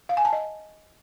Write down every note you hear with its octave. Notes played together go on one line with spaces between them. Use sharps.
F5
G#5
A5
D#5